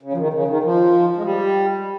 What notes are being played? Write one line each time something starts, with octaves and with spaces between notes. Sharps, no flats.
C#3
F3
D#3
C#3
D#3
F3
G#3
G3